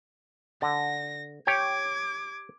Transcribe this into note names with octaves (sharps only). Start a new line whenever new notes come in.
D3 A#6
G4 C#5 G5 D6 G#6